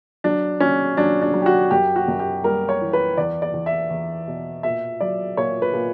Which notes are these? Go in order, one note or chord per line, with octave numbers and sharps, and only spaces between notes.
F#3 D4
F#3 C#4
F#3 D4
D4
F#3
G4
F#4
F#2 G4
F#4
F#2
G4
G3 A#4
C#5
E3
B4
E2 D5
D5
E2
E5
E2
B2
A#2 E5
F#3 D5
A#2 C#5
B4
A#2